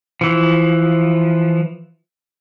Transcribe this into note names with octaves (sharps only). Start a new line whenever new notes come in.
E3 F3